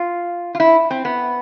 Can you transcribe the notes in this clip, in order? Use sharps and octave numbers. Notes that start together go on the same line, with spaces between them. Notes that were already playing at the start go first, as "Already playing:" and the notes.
Already playing: F4
F4
E4
C4
B3